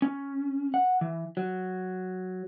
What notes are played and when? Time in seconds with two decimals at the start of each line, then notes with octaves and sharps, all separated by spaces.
0.02 C#4
0.74 F#5
1.01 E3
1.37 F#3